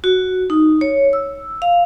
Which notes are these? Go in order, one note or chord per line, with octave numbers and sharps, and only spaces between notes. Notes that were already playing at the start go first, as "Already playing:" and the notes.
F#4
D#4
C#5
E6
F5